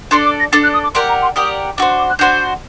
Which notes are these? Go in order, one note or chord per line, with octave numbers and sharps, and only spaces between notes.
D4 A4 D5 C6
D6
A#6
D4 A4 D5 A6
F#6
D#6
D6
G4 A#4 D5 F#5 C6
A#5
C6
G4 A#4 D5 F#5 D#6
D4 F#4 C5 D6
C6
D6
F#6
D4 F#4 C5 G6